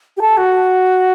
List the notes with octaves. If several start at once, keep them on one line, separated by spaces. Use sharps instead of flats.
G4
A4
F#4